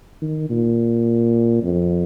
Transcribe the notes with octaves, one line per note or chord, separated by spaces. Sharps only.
D#3
A#2
F2